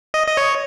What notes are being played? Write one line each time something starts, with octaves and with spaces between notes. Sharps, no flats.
D#5
D#5
C#5